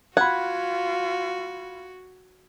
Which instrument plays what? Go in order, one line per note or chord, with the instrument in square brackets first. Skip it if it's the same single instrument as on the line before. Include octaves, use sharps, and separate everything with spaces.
[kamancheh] F4 [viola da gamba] F#4 [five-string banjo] F#5 [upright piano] B5 G#6